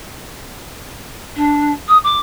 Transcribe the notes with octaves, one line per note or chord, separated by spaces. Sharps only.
D4
D#6
D6